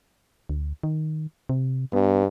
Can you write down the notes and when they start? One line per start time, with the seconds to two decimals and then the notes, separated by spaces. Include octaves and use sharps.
0.49 D2
0.83 D#3
1.49 C3
1.93 G2 B3